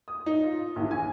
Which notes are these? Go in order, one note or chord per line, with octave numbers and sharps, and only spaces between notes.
D#6
D#4
F4
A#1 D#2 E3
G#5